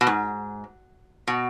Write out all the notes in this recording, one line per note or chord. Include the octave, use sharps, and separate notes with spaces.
B2
G#2
B2